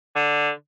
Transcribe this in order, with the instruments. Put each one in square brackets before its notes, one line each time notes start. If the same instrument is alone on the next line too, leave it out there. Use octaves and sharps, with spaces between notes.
[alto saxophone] D3